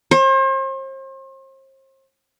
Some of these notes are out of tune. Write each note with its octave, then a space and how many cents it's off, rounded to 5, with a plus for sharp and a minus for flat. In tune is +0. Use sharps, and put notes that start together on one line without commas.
C5 +40